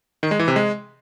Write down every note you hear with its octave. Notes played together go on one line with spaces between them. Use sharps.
D#3
G#3
E3
C3
G#3